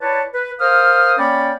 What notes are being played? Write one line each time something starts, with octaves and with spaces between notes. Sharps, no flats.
E4 B4 C#5 D5 A5
B4
A#4 C5 F5 D#6 F6
A#3 C#4 C#5 D5 G5 B5